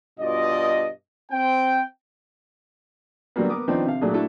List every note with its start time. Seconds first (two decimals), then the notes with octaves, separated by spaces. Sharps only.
0.20 G2 B2 F4 D5 D#5
1.31 C4 G5
3.36 D3 F#3 G3 A#3 B3
3.49 B3 A#4 D6 D#6
3.68 D#3 F3 B3 C4 D4 D#4
3.86 C3 F5
4.01 A#2 F#3 A3 D4 G#4
4.14 A3 D4 E4 F#4 A4